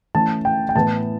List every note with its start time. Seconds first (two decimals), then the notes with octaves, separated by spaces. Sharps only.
0.15 E3 A3 C#4 A5
0.45 G5
0.69 G5
0.75 A2 E3 B3 A5